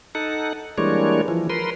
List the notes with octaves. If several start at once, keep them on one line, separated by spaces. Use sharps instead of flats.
D#4 A4 F#5
E3 G3 G#3 A#3 D4 C#5
E3 F3
A#4 B4 C6